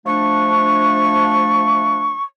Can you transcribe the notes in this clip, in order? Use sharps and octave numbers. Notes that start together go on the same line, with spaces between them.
F3 A3 D4 C#6